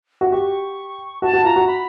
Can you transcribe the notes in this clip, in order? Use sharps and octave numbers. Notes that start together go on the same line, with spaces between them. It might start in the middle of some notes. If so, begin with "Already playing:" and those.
F#4
G4 C#6
F#4 A5
F#4
F4 A#5
F#4
B5